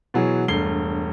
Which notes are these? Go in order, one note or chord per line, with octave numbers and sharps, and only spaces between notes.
B2 E3 F#3 F#4 G#4
E1 G2 A3 C7 G7